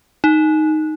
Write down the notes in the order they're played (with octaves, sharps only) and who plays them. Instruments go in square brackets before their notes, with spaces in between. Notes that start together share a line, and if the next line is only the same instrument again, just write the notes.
[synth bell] D#4